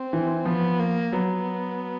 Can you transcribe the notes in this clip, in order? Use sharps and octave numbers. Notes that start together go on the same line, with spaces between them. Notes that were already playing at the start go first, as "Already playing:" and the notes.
Already playing: C4
E3
F3 B3
A#3
F#3 B3